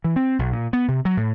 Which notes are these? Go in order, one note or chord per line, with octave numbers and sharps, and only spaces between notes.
E3
C4
B1
A#2
B3
C3
F#3
A2